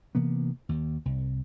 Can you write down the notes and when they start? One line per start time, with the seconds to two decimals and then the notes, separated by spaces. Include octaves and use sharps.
0.15 C3 E3 A#3 B3
0.69 D#2
1.05 C2